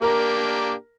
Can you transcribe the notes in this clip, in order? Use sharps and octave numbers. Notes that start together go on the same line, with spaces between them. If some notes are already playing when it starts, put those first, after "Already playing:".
A#3 D4 G4 A#4 A#5